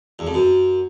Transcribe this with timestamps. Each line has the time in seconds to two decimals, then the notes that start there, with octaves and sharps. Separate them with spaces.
0.19 E2
0.27 F2
0.34 F#2